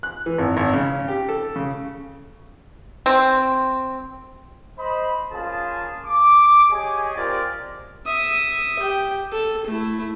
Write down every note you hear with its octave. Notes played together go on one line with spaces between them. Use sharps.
F#6
E3
G#1
G#1
C#3
G4
A4
C#3
C4
C5 D#5 B5
A#3 C#4 F4 G#4 A5
D6
G4 G#4 C#5 D#5 G#5
C4 F4 G4 A#4 D5 G5
E5 D#6
G4 G5
A4
A3 E4